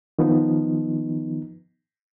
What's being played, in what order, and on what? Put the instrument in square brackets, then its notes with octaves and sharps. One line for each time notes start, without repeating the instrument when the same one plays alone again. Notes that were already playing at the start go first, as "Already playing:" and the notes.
[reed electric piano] D#3 F3 B3 D#4